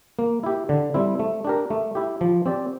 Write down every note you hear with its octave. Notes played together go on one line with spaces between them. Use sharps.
A#3
E4 G4
D3
G3 C4 E4
A3
D4 G4 A#4
A3
E4 G4
F3
C4 G4 D5